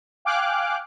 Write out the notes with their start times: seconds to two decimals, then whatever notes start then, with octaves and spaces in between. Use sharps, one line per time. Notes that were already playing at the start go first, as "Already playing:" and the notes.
0.25 F5 G5 G#5 D6 F6 F#6